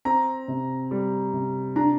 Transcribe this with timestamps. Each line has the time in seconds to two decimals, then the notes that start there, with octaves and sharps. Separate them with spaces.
0.05 C4 A#5
0.48 C3
0.91 G3
1.33 C3
1.76 D4 A#5